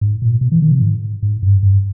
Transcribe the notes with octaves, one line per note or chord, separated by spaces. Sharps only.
G#2
A#2
B2
E3
D#3
C3
G#2
G#2
G2
G2